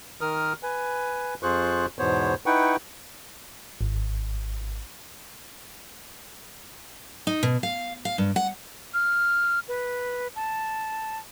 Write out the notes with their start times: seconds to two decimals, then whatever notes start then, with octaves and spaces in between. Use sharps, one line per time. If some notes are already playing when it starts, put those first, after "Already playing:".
0.21 D#3 A#4 D#6 F6
0.63 B4 G#5
1.43 F2 F4 G#4 C5 C#6 F#6
1.99 E2 G#2 B2 B3 C5 C#5
2.46 D#4 E4 B4 F#5 G5 C#6
3.81 G#1
7.27 D#4
7.43 B2
7.63 F5
8.05 F5
8.18 G2
8.36 F#5
8.94 F6
9.68 B4
10.36 A5